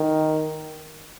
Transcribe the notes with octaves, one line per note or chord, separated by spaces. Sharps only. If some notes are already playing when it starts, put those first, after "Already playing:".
Already playing: D#3